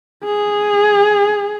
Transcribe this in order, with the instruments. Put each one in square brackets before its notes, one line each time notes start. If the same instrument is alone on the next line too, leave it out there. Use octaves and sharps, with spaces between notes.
[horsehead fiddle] G#4